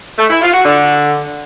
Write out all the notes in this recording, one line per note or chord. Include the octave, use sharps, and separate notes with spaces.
A3
E4
F4
F#4
D3